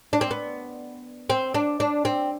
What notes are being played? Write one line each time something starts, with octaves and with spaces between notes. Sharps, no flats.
D4
C4
B3
C4
D4
D4
C4